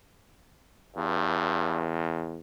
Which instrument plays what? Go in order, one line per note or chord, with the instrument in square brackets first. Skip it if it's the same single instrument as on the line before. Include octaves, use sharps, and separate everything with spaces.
[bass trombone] E2 [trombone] G2